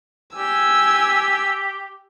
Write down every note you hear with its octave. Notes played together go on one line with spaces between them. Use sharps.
G4 G#5 E6